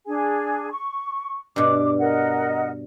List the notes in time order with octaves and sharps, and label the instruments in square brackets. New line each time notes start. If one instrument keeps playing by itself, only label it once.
[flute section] D4 G#4 G#5
C#6
[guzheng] G2 B2 [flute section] D6
[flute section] A#4 D#5 F#5